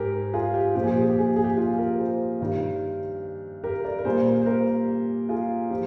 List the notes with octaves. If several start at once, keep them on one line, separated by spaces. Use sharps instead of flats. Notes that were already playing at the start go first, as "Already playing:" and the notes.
Already playing: G#2 G4 G#4 A#4
F4 G#4
G4
A#2 F3 G4
G#4
G4
G#4
G4
G#4
G4
G#4
G4
F4 G#4
G#4
G4 A#4
G#4 C5
G2 D#3 G3
G4 A#4
A#4 D5
A#4
A#2 G3 G#4 C5
C5
G4 A#4
F4 G#4
F3 G4